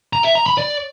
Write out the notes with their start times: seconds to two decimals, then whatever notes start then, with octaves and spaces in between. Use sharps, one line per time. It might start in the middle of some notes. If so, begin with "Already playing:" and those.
0.13 A#5
0.24 E5
0.35 A#5
0.46 B5
0.58 D5